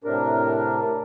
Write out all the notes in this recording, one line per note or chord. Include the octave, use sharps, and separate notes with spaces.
A2 C3 D4 A#4